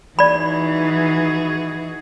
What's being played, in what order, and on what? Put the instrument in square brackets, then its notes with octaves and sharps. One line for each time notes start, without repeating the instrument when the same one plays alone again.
[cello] E3 [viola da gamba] D#4 F#4 G#4 [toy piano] D5 B5